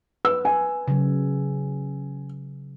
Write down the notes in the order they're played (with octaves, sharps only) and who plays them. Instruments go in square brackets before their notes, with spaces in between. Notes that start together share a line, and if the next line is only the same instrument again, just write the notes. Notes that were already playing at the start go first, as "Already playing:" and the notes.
[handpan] B4 [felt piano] E6
[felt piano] G#5
[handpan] C#3 F#3